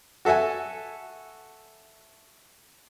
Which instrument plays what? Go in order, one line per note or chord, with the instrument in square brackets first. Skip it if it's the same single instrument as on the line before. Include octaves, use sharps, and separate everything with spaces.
[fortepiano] F#4 A4 E5 F#5 G#5